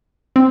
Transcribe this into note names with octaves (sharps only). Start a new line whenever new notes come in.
C4